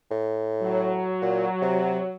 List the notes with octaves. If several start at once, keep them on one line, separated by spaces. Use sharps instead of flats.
A2
F#3
A#2
C3